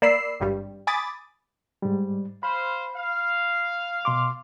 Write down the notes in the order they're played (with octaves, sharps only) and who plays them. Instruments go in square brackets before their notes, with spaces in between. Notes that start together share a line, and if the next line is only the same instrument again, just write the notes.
[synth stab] A#3 D5 B5 E6 C7
G#1 G2 G3
G#5 B5 D6 D#6 A6
[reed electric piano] G#2 G3
[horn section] C5 F5 [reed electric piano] B5
[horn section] F5
[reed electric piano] B2 C6 D6